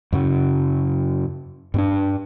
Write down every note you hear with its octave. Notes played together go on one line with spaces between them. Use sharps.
F#2 C#3 F#3
G2 C4 D4